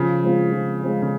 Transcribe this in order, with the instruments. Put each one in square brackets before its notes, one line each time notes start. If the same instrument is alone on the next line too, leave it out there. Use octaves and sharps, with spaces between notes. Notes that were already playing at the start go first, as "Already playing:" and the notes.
Already playing: [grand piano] C#3 [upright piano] F3
[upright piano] G#3 C4 F4
F3
G#3 C4 F4
[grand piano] C#3